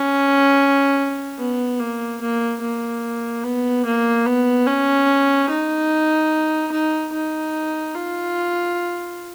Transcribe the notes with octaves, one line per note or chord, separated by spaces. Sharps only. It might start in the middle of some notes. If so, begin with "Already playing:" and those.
Already playing: C#4
B3
A#3
A#3
A#3
B3
A#3
B3
C#4
D#4
D#4
D#4
F4